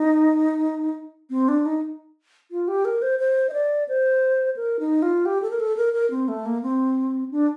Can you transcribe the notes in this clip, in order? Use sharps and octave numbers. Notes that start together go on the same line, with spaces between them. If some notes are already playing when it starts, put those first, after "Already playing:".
Already playing: D#4
C4
D4
D#4
F4
G4
A#4
C5
C5
D#5
D5
C5
A#4
D#4
F4
G4
A4
A#4
A4
A#4
A#4
C4
A3
A#3
C4
D4